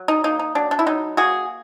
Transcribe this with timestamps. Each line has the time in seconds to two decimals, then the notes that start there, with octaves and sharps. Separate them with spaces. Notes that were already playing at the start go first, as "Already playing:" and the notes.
Already playing: F#3
0.08 D#4
0.24 A#3 D#4
0.39 D#4
0.55 F#3 D4
0.71 D4
0.79 E4
0.86 F#3 D#4
1.17 A#3 F#4 G#4